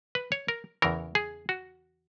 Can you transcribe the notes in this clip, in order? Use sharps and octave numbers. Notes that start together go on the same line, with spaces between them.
B4
C#5
A#4
E2 C#3 E3 A#4
G#4
F#4